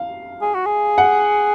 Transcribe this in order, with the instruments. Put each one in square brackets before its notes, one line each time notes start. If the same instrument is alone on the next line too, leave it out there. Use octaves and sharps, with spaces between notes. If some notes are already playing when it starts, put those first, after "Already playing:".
Already playing: [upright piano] F5
[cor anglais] G#4
F#4
G#4
[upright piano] F#5